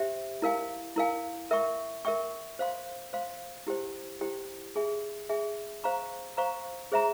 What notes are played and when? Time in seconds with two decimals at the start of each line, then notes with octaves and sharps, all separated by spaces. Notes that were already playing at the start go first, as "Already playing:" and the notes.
Already playing: G4 C5 E5 G5
0.42 E4 A#4 F5 G#5
0.96 E4 A#4 F5 G#5
1.51 A#4 E5 G5 C#6
2.05 A#4 E5 G5 C#6
2.59 C5 F5 C6
3.13 C5 F5 C6
3.67 E4 G4 C5 G5
4.21 E4 G4 C5 G5
4.76 G#4 E5 G#5
5.29 G#4 E5 G#5
5.84 C5 F5 A#5 C#6
6.37 C5 F5 A#5 C#6
6.92 G#4 C5 E5 A#5